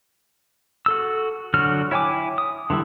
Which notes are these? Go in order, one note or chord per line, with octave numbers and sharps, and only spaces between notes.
F#4 A4 E6
D3 F#3 F#4 F6
E4 C#5 G5 G#5 D6
D#6
D3 E3 G3 E4